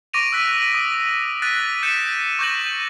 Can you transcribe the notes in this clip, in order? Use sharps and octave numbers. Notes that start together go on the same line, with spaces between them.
C#6 D6 A#6 D7 D#7 F7
E6 F#6 B6
D#6
F#6 A6 B6 D#7
G6 B6 C#7 D#7 E7
C#6 D6 G6 A#6 F#7